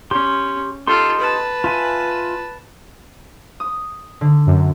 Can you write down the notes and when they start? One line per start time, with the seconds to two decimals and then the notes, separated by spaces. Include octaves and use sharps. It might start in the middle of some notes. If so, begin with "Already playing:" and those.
0.11 C#4 G4 C6
0.87 D#4 F4 G4 A4 C6
1.19 B4 A5
1.64 F4 E5 G#5
3.60 D#6
4.21 D3
4.46 F#2